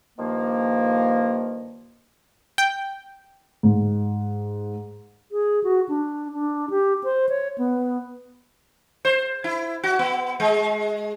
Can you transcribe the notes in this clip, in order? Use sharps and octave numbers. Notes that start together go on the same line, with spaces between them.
G2 D#3 F3 A#3
G5
G#2
G#4
F#4
D4
D4
G4
C5
C#5
B3
C5
E4
F#4
B3
G#3